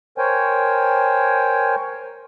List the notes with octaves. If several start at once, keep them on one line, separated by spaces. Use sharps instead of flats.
A#4 C5 C#5 G5 G#5